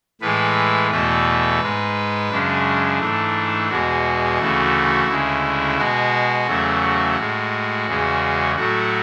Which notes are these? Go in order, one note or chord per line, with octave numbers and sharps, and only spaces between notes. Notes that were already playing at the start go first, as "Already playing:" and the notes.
A2 E3 G#3 B4
E2 B2 A3 B4
G#2 G#3
F#2 C#3 G#3 D4
G#2 E3 A3
E2 B2 G#3 F#4
D2 C#3 E3 A3
D2 C#3 G#3 E4
B2 G#3 F#4
E2 C#3 F#3 A3
A2 G#3
E2 C#3 G#3
A2 F#3 A3 F#4